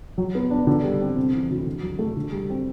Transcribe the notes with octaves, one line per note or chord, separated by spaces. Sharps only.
F#3
B3
D4
D3
G3
C4
C3
E3
D2
D3
F#3
A3
D3
G3
C4